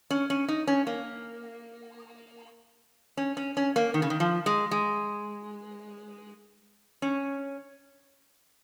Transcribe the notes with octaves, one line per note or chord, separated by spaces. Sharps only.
C#4
C#4
D#4
C#4
A#3
C#4
C#4
C#4
A#3
D#3
C#3
D#3
F3
G#3
G#3
C#4